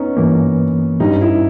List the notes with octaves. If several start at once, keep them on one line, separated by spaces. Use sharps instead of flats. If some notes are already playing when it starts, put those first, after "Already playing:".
Already playing: B3 C#4 D#4
G2 E3 A#3
G2 G3 C#4 D#4
E4